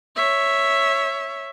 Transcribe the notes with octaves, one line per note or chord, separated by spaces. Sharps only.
C#5 E5